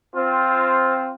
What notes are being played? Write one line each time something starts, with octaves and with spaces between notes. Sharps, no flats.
C4 F4